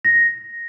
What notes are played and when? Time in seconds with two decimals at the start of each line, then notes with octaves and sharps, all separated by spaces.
0.05 A#6